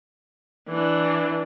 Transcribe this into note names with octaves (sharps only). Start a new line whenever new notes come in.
E3 D4